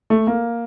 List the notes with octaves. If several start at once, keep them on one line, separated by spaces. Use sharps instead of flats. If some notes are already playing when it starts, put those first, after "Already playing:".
A3
A#3